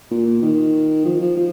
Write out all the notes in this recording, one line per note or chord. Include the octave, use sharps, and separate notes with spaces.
A#2
D#3
F3
F3
F3